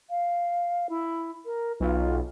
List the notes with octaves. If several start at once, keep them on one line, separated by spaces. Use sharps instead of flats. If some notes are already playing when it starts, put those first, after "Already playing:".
F5
E4
A#4
B1 F4